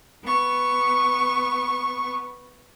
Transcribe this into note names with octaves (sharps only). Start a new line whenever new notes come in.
B3 C#6